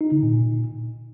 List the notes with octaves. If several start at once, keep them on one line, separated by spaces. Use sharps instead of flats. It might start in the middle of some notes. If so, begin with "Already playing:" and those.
D#4
D3
A#2